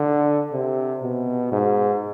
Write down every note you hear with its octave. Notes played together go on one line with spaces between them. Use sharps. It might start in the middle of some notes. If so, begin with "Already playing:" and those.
Already playing: D3
C3
B2
G#2